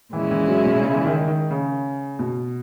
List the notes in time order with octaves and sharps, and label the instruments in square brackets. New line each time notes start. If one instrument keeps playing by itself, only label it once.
[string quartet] A#2 G#3 C#4 E4 [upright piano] E3
[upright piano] E3
F#3
B2
C#3
E3
D#3
D#3
C#3
B2